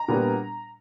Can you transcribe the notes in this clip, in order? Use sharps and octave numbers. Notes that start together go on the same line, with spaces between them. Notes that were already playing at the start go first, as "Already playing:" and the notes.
Already playing: A#5
A#2 G3 B3 D4